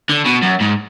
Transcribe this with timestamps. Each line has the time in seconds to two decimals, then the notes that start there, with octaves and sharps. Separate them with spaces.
0.09 D3
0.25 B2
0.42 F#2
0.60 G#2